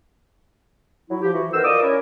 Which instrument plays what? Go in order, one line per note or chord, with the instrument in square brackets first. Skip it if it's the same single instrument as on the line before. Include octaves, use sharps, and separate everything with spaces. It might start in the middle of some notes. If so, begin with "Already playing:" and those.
[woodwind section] F#3 E4
F3 G4
E3 F#4
D#3 B3 A4 A#4 C5 E6
F4 A#4 D5 D#5 D6 D#6
C#4 E4 A#4